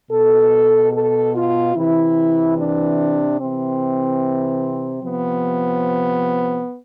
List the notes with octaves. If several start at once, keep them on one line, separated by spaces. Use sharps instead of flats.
B2 A4
A4
F4
C3 E3 E4
D4
C3 E3 C4
C3 F3 B3